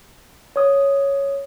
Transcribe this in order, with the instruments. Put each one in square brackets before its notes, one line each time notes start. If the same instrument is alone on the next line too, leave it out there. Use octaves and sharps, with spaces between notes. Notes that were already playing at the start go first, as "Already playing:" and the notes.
[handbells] C#5 D#6